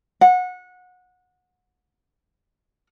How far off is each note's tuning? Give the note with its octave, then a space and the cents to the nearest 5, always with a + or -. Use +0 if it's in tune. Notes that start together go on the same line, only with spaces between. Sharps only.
F#5 -25